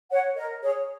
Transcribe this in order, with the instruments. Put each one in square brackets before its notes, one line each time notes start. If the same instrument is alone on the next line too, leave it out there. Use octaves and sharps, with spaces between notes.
[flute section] C#5 F#5
A#4 D#5
G#4 C#5